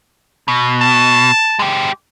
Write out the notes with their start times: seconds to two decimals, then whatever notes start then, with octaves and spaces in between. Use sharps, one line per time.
0.48 B2
0.81 A5
1.59 G#3 G4